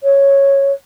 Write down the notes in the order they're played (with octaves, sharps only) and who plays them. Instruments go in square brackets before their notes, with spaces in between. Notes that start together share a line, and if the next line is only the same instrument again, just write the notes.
[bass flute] C#5